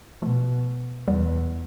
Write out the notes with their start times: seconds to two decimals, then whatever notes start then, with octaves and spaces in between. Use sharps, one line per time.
0.22 B2 F3 A3
1.07 E2 G3 B3